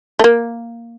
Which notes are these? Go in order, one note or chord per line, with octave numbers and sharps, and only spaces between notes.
A3
A#3